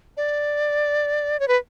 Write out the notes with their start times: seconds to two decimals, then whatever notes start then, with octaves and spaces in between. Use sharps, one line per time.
0.17 D5
1.40 C#5
1.48 B4